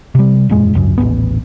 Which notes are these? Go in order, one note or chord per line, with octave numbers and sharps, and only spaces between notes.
C3 G3
E1 F#2 A#2 G#3
G#1 C#2 F#2
D#1 A1 F2 B3